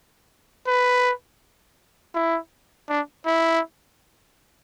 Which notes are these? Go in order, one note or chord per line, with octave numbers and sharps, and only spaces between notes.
B4
E4
D4
E4